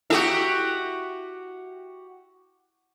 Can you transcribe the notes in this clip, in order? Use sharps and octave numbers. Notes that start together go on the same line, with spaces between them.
E4 F#4 G4 A4 E5